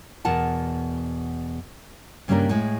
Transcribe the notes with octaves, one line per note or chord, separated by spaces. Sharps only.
E2 B2 A#4 F#5 A5
G2 C#3 G3 A#3 D4 A#4
A2 G#3